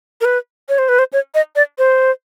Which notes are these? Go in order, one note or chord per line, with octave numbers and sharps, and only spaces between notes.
A#4
B4
C#5
C5
B4
C5
C#5
D#5
D5
C5